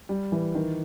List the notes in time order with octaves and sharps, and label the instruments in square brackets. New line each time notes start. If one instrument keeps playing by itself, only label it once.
[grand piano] G3
E3
D#3